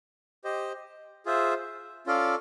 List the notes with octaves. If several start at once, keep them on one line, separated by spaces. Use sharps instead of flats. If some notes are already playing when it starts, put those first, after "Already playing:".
G4 C5 D#5
F4 G#4 C5 E5
C#4 F4 A4 D5 F5